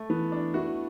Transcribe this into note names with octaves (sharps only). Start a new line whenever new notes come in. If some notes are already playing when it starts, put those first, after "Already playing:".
Already playing: A3
E3 B3
D4
E4 F#4